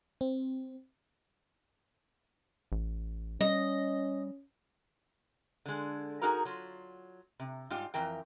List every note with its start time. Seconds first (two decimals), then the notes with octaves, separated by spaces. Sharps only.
0.21 C4
2.72 A1
3.41 G3 C#4 D#5
5.66 D3 G#3
6.22 D#4 F#4 G#4 A#4 A#5
6.45 F#3 F4
7.40 C3
7.70 G#2 G3 F4 G4
7.94 F2 E3 A#4 G5